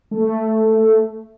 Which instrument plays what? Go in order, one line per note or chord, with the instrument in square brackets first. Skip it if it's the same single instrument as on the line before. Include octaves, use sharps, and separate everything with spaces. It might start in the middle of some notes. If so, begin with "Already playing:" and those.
[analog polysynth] A3